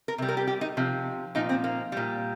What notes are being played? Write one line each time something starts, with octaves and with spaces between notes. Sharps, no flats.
A#4
C3 G3
A#4
G4
G4
D#4
C3 F3
A#2 F3 D#4
C4
A#3
A#2 G3